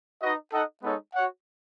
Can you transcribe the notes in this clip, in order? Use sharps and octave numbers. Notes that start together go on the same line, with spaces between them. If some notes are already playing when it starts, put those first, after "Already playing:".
D#4 F#4 B4 D#5
D#4 A4 D#5 F#5
G#3 B3 D#4 A4 C#5
F#4 C#5 F#5